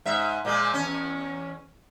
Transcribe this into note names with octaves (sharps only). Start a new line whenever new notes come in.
G#2 E5
A#2 F3 G#3
E2 C#4